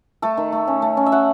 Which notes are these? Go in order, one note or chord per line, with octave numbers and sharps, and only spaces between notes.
A3 A4
D#3
A3
C#4
A3
C#4
E5
A3 F#5